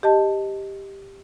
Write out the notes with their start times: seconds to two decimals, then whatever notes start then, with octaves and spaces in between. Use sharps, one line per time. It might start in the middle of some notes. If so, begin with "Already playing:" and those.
0.03 G4 D#5 A5